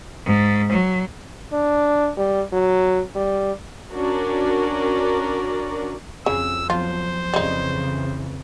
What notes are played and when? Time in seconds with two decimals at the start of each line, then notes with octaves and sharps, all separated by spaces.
0.24 G#2
0.71 F#3
1.52 D4
2.17 G3
2.53 F#3
3.15 G3
3.92 C#4 D4 F#4 A#4 D5
6.26 F2 C#3 F#4 G#5 E6
6.70 F3 F#3 B3 F4 C5
7.34 F2 C#3 E3 G3 D#4